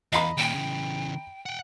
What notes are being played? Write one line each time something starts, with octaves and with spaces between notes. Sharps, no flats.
E2 D#5 F5 A#5 B5
D#2 A#2 G5
C#3 E3
F#5 G5